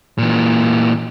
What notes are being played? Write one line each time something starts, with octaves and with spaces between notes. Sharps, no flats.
A#2 E3